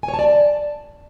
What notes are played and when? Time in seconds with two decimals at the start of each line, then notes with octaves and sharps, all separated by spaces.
0.03 G#5
0.08 C#5
0.14 A5
0.19 D5
0.24 A5